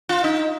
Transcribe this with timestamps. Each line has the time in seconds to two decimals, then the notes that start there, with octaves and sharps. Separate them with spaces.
0.09 F4
0.24 D#4